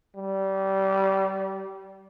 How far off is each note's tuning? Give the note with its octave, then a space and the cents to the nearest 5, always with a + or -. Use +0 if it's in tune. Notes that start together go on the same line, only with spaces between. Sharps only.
G3 -25